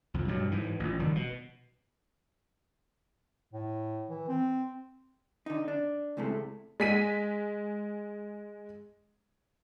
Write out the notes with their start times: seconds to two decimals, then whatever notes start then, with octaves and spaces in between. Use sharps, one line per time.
0.14 C2 F2
0.28 G2 B2 F#3
0.51 G#2 E3
0.80 A1 A#2
0.99 F1 D#3 G3
1.15 B2
3.53 A2
4.09 E3
4.28 C4
5.46 D3 D#4
5.68 D4
6.17 C#2 A2 C3 G#3 A3
6.80 G#3 B6 D#7